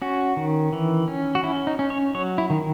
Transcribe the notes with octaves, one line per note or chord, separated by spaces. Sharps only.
C#4 F#4
D#3
E3
C#4
F#4
C#4 E4
D#4
C#4
C#5
F#3 C#5
E4
D#3